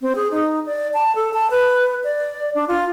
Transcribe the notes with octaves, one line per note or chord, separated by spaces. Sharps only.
C4
G#4
D#4
D5
A5
A4
A5
B4
D5
D4
F4